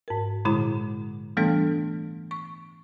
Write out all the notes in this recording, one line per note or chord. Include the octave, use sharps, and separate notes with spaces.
G#2 A#4
A#2 D3 G#3 E4 A#5
E3 G3 A3 B3 D4 A4
C#6